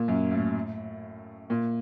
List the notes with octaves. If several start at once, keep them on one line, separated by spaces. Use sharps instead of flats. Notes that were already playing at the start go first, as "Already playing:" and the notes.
Already playing: A#2
F#2
A2
A#2